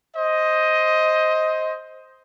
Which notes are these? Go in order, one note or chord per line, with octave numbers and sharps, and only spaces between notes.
C5 D#5